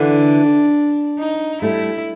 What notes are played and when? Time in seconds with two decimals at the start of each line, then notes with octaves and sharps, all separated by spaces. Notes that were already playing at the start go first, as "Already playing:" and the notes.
Already playing: D3 E3 D4
1.19 D#4
1.62 G3 A3 E4